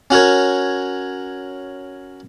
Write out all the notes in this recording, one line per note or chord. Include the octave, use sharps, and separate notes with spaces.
C#4 F#4 A#4 C#5